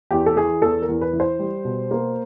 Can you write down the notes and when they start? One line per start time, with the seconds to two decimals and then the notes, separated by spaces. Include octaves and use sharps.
0.11 E2 G4
0.26 A4
0.36 E3 G#4
0.62 E2 A4
0.82 A#4
0.89 E2
1.01 B4
1.13 E3
1.20 C5
1.39 G3
1.65 B2
1.91 A#3